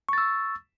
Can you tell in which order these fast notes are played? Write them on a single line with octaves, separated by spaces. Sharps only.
C#6 A6 E6